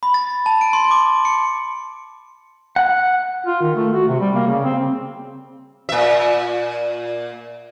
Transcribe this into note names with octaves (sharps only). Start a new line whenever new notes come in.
B5
A6
A5
D7
C6
D6
C#7
F#5
F4
D#3
A3
F#4
C3
G3
A#3
C#3
C4
A#2 E5